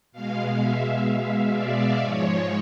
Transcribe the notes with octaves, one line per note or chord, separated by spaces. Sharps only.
B2 G#3 F5
E5
D5
G#2 F3 G#3 C#5